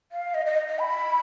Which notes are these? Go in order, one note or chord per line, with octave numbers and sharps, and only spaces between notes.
F5
D#5
D#5
D#5
B5